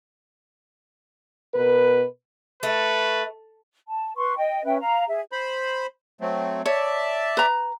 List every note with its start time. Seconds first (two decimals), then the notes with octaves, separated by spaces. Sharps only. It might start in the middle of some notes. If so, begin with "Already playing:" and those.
1.54 B2 A#4 B4
2.63 A3 B4
3.86 A5
4.17 B4 C6 C#6
4.37 D#5 G5
4.65 C#4 B4 E5 G5
4.80 F5 A#5
5.08 G#4 E5
5.32 C5 B5
6.21 F#3 A3 C4
6.66 C#5 D5 E5 A5
7.37 B4 A#5